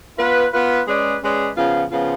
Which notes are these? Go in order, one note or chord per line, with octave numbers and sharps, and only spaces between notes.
B3 F4 B4
B3 F4 B4
G#3 C#4 G#4 B4 D5
G#3 C#4 G#4 B4 D5
C#3 F3 B3 F4
C#3 F3 B3 F4